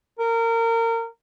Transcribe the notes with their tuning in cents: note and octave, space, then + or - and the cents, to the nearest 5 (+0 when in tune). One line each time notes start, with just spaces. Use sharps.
A#4 -25